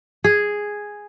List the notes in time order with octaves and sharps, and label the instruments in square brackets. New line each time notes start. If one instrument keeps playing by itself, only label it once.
[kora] G#4